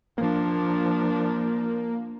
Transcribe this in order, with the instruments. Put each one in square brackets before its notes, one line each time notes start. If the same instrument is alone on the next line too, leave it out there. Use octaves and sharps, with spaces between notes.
[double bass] F3 D4 [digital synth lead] A#3